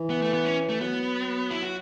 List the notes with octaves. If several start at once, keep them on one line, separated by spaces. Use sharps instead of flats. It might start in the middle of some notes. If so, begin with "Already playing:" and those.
Already playing: E3
B3
A3
B3
C#4
A3
F#3 B3
E4
F#4